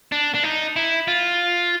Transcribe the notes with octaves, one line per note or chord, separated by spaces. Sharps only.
D4
D4
D#4
E4
F4